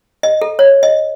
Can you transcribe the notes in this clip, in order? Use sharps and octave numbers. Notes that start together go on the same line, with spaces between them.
D#5
A4
C#5
D#5